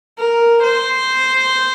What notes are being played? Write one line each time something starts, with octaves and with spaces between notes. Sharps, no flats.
A#4
C5